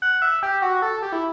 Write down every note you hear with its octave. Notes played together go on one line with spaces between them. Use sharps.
F#5
E5
G4
F#4
A4
G4
E4